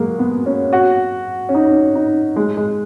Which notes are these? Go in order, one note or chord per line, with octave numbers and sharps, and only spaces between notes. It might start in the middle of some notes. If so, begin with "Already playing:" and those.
Already playing: F#3 G#3 A#3
B3
C#4
F#4
C#4
D#4
D#4
G#3
G#3